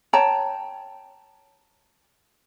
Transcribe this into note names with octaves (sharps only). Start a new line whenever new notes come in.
C#5 G5 A5 A#5